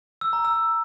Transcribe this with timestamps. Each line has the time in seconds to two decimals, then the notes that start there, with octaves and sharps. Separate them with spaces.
0.21 E6
0.33 A#5
0.45 E6